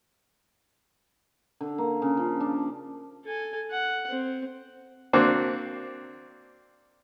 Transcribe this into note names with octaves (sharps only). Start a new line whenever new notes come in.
D3
A#3
C#3
F3
D4
A4 G#5
F#5
C4
A#3 C4 D4 F#4